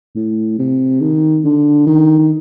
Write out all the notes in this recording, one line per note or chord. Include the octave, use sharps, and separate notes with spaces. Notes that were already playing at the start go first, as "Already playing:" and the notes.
A2
C3
D#3
D3
D#3
D#3